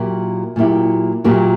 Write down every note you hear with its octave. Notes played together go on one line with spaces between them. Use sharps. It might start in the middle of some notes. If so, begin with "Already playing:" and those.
Already playing: A#2 F#3 A#3 E4 G4
A#2 F#3 A#3 E4 G4
A#2 F#3 A#3 E4 G4